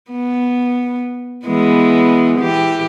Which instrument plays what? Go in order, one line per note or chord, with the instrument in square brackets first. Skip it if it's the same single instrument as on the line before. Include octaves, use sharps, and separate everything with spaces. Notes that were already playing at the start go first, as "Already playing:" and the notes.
[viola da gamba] B3
E3 G#3 B3
E3 G4